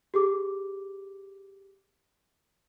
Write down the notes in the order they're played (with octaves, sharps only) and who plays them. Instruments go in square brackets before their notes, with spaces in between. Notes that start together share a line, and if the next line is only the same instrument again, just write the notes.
[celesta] G4 G#4 D6